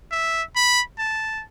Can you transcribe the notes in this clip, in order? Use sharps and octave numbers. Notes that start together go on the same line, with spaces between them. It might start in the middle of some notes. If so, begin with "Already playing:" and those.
E5
B5
A5